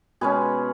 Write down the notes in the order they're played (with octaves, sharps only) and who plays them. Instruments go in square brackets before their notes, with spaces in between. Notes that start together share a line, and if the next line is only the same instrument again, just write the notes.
[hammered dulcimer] B2 G#3 C#4 G#4 B4